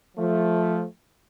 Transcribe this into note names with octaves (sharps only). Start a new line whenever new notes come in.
F3 A3